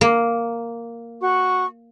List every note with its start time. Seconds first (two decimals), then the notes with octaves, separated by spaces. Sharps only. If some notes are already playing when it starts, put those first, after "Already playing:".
0.01 A#3
1.21 F#4 C#6